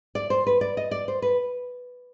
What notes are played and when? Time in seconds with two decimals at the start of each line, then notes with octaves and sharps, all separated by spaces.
0.15 D5
0.30 C5
0.47 B4
0.61 D5
0.77 D#5
0.91 D5
1.08 C5
1.22 B4